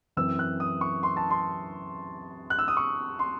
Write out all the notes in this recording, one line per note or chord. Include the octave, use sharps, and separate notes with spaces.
F#2 E3 C4 E4 E6
F#6
D#6
C#6
C6
A5
C6
F#6
E6
D#6
C#6
C6